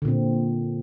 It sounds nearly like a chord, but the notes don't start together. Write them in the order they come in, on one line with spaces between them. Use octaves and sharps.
D3 A#2 C4